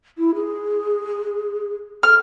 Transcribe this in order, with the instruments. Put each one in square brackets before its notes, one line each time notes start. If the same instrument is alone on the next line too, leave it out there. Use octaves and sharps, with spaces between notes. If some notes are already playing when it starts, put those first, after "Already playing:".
[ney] E4
G#4
[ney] A4 [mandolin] F6